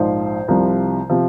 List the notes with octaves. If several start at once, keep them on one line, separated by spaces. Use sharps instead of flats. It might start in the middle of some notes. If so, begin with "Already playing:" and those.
Already playing: A#1 G#2 F3 C5
C2 C3 F3
C3 F3